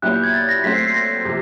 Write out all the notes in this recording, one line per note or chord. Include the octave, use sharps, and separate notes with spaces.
A#2 F#3 B3 E4 G4 F#6
G6
G#6
A6
A#6
F#3 A3 C4 B6
C7
C7
A#6
C3 F3